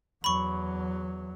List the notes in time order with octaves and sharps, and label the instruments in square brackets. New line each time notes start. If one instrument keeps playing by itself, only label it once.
[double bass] E2 F#3 [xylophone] B5 C#6